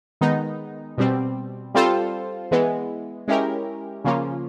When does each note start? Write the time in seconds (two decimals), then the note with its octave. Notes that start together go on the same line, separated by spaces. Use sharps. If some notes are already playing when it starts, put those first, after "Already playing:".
0.21 D#3 G#3 B3 D#4
0.98 B2 G3 C4
1.75 G3 C4 F4 A4 C5
2.51 E3 G#3 B3
3.28 G#3 C#4 E4 G4 A#4
4.05 C#3 F3 A#3 C#4 F4